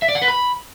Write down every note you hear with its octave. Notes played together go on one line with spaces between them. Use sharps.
E5
D5
F#5
B4
B5